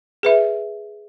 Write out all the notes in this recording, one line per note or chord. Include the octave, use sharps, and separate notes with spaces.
G#4 B4 E5